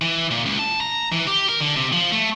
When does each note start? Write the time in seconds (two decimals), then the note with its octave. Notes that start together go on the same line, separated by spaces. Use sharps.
0.01 E3
0.31 A#2
0.46 C#2
0.59 A5
0.80 A#5
1.12 E3
1.27 G4
1.49 A#4
1.61 D3
1.76 C3
1.93 F3
2.12 A3